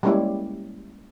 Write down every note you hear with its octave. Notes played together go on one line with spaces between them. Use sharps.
G3 G#3 A#3 C#4 E4 G4